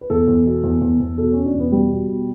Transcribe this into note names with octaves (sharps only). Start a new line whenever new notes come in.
B4
E2 A4
E2
B2
E2
E2
E2
B2 A4
B2 C#4
D4
E2
B3
B2 G3
B2
B2